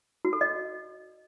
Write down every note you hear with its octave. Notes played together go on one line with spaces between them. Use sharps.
F#4
A4
D#5